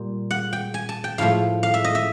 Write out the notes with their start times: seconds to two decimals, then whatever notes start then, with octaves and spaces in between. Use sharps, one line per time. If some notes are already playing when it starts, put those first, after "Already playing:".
Already playing: A#2 G3
0.31 F#5
0.53 G5
0.74 G#5
0.89 A5
1.04 G5
1.18 A2 F3 A3 F5
1.63 F5
1.74 E5
1.84 D#5
1.95 E5